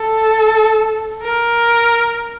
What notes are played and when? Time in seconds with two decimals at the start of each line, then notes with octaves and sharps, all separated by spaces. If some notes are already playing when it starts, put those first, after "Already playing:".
Already playing: A4
1.22 A#4